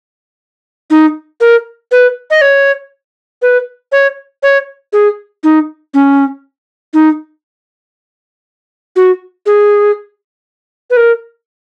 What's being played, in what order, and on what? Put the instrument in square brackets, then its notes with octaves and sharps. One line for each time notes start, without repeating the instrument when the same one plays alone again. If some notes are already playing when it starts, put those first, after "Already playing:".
[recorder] D#4
A#4
B4
D#5
C#5
B4
C#5
C#5
G#4
D#4
C#4
D#4
F#4
G#4
B4
A#4